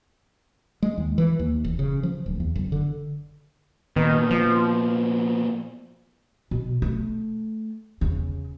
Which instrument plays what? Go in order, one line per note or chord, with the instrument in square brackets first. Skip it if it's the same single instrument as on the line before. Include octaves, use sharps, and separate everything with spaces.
[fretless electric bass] G#3
D#2
E3
D#2
E1
C#3
F3
D1
E2
F#1
D3
[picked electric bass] A#2 B3 [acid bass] D#3
[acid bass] F3
[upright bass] B2
A3
E2 C#3